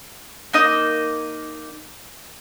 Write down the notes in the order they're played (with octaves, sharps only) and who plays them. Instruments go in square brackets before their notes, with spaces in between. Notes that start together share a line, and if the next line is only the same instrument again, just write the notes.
[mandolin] A#3 D#4 D#5